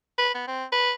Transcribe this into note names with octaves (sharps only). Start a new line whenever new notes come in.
B4
B3
C4
B4